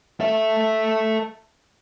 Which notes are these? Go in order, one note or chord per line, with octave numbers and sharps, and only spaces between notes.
A4 E5